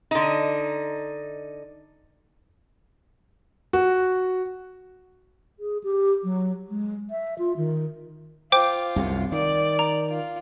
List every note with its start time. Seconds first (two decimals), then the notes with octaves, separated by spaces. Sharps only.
0.11 D3 D#4
3.73 F#4
5.60 G#4
5.84 G4
6.24 F#3
6.70 G#3
7.10 E5
7.39 F4
7.57 D#3
8.52 F4 C5 G5 D6
8.96 C2 F#2 C3
9.32 D#3 D5
9.79 A#5
10.09 F4